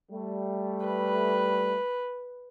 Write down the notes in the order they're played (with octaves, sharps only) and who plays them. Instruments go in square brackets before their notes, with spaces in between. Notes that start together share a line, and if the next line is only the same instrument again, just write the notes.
[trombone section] G3 A3
[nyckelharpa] B4